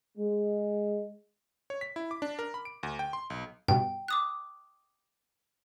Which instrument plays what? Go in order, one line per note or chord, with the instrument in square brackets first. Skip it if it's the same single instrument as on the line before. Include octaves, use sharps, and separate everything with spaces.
[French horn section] G#3
[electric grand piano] C#5
B6
E4
D6
D4
A#4
B5
D7
D2
G5
C6
B1
[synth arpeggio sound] G2 B2 [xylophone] G5
[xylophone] D6 D#6 F#6